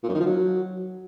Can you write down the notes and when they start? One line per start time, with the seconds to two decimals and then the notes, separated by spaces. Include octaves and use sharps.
0.03 A#2
0.09 F#2
0.14 D#3
0.20 F3
0.26 F#3